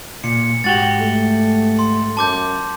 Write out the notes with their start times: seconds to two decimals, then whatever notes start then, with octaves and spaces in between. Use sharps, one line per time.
0.24 A#2 C#7
0.64 G#2 F#4 G4 A6
1.00 A3
1.79 C6
2.17 F#2 A5 D6 G6